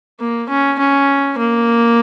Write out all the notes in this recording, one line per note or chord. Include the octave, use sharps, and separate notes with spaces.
A#3
C#4
C#4
A#3